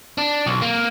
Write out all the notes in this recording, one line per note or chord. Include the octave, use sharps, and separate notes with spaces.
D4
B1
A#3